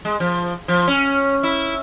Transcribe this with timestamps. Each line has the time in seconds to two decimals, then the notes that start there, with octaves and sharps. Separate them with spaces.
0.05 G#3
0.20 F3
0.68 F3
0.87 C#4
1.43 E4